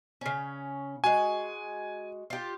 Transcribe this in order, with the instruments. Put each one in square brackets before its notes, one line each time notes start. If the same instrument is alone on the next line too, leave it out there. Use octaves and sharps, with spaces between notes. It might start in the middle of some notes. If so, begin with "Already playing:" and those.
[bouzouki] C#3 C#4
[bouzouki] G#3 F#4 [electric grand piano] G#5
[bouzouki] F4 G4